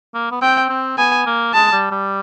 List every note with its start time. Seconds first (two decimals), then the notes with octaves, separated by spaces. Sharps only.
0.15 A#3
0.31 B3
0.42 C4 G5
0.70 C4
0.98 B3 G#5
1.26 A#3
1.54 G#3 A5
1.72 G3
1.92 G3